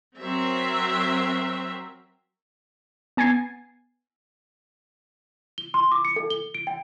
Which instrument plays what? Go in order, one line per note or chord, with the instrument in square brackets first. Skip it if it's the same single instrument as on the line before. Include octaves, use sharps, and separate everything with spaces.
[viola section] F#3 C4 A#4 E5
[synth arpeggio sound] B3 G#5 G#6 A6 C7
[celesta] G7
C6
D6
C#7
A4
G7
D7
G5